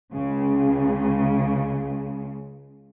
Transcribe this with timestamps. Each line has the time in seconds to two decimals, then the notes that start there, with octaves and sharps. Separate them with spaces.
0.14 C#2 C#3